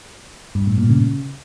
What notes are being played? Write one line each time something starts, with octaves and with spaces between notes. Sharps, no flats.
G2
A2
A#2
C#3